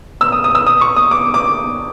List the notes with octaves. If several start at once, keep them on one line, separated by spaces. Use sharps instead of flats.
E6
D#6
D#6
E6
D#6
C#6
D#6
D6
D6